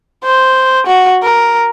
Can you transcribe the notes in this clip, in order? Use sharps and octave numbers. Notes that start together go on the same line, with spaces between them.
C5
F#4
A#4